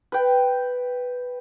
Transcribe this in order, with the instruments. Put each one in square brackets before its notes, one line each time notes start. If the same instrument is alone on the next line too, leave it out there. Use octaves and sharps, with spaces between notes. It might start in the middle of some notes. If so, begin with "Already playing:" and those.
[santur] B4 G5